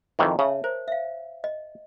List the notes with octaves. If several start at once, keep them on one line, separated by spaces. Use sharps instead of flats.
F2 D#3 E3
C#3 C#5 E5 A5
A#4 C5
E5 F5
D#5